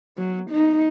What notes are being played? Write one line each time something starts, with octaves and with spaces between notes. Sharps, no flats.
F#3
D#4